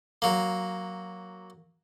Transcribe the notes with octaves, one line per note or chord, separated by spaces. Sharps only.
F#3 A#3